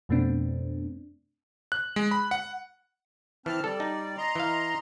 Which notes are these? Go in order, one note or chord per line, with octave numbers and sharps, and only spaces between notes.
F2 B2 A3 B3 C4 D4
F#6
G#3
B5
F#5
E3 C4 A5 F6
G3 A4 D5
D#4
D#5 A#5 C6
E3 F5